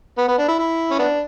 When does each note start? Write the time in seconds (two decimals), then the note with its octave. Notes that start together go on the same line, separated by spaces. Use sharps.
0.18 B3
0.28 B3
0.38 D4
0.48 E4
0.59 E4
0.91 C#4
0.99 B3 D4